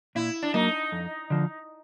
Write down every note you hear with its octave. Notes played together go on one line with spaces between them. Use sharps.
A#2 E4
D4
F#3 A#3 D#4
F2
D3 F3